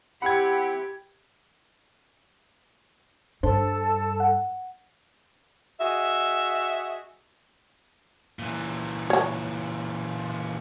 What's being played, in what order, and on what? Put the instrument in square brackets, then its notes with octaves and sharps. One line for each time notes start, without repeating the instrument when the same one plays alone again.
[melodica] C4 E4 [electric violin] G4 [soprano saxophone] F#5 [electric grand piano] B5 G#6
[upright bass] G2 [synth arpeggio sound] D4 C5 [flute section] A4 A5
[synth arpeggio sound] F#5
[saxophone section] F#4 G#4 D#5 E5
[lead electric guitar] A#2 E3
[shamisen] C#5 A#5